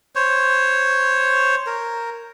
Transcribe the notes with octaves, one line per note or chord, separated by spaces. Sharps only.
C5 C#5
A#4